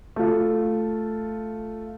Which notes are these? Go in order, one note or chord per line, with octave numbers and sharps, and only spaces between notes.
A3 F4